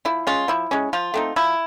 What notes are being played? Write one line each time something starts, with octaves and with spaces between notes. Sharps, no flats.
F3 E4
G#3 C#4 F4
F3 E4
G#3 C#4
F3 F4
A3 C4 D#4
F3 E4